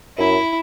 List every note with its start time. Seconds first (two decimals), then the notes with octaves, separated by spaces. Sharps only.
0.18 F#2 E4